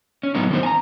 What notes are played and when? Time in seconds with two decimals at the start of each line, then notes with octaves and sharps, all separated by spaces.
0.23 C#4
0.35 A2 F#3 G#3 B3 D#4
0.50 D#3 E3 B3 C4 C5
0.63 G#5 A#5